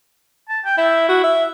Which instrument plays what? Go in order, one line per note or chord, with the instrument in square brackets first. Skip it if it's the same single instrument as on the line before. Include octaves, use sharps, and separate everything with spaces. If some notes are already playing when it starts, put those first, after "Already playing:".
[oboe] A5
G5
[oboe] E4 [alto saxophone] E5
[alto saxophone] F#4
E5